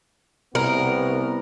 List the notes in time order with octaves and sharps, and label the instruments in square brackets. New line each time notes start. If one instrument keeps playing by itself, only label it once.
[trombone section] C2 B3 [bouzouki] A#4